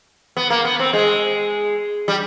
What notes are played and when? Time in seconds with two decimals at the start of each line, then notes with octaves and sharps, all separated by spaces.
0.37 B3
0.50 A#3
0.65 B3
0.79 C4
0.93 G#3
2.08 G3